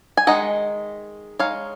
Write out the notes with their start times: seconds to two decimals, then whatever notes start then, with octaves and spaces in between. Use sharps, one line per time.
0.17 G#5
0.27 D#3 G#3 D#4 D#5 F#5
1.39 G#3 D#4 C#5 F5